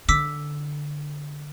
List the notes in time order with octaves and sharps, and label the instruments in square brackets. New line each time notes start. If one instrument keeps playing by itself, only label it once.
[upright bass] D3 [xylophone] D6 E6 B6